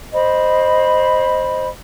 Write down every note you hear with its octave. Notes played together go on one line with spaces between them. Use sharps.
C5 D#5 B5